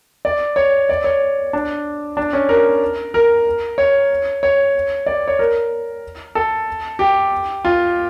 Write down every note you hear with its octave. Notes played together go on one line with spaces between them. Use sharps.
D5
C#5
D5
C#5
D4
D4
C#4
A#4
A#4
C#5
C#5
D5
C#5
A#4
A4
G4
F4